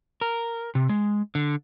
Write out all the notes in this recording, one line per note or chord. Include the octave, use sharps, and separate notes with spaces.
A#4
C3
G#3
D3